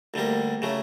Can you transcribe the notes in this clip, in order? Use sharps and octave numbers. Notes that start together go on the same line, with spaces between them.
D2 D3 G3 A#3
C#3 F#3 A3